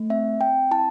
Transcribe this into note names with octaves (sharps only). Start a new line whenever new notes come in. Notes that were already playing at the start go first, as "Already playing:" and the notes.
Already playing: A3
C4 E5
C4 G5
E4 A5